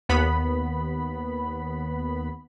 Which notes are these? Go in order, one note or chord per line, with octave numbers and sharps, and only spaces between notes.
D#2 B3 B5